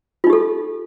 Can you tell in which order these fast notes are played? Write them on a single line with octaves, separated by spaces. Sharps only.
F4 D#4 G4 A4